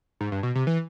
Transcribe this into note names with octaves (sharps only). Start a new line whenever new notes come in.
G#2
G2
B2
C3
E3